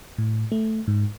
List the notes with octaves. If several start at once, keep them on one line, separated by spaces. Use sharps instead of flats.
A2
A3
G#2